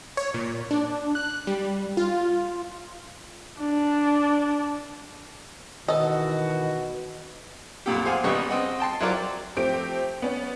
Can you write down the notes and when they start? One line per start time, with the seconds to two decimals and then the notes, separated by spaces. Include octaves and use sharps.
0.17 C#5
0.34 A#2
0.71 D4
1.15 F#6
1.47 G3
1.97 F4
3.60 D4
5.88 B2 D#3 E3 F#4 A4 D#5
7.86 B1 F2 A#2 G4
8.05 G#4 C5 F5 F#5 G#5
8.24 G#1 C#3 G3 B3 D#5 C#6
8.49 C4 D#5 F#5
8.80 G5 A5 C6
9.00 F#3 E4 F4 A#4 C5 D5
9.56 F3 A3 C4 G4 D7
10.22 B3 C#4